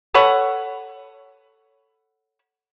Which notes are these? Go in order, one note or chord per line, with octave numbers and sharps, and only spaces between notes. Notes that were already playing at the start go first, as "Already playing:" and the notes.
A4 B4 C#5 F#5